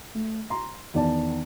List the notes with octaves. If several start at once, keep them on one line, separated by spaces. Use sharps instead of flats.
A3
A#5 C6
E2 D#3 D5 A5